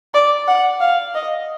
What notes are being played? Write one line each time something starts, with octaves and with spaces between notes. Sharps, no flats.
D5
F#5
F5
D#5